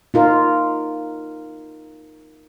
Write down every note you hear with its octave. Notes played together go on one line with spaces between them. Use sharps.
D#4 F4 A#4